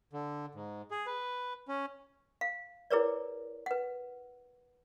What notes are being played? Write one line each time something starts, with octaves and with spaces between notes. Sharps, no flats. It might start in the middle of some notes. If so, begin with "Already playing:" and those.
D3
G#2
G#4
B4
C#4
F5
E4 G#4 A#4 B4 C#5 D5
B4 F#5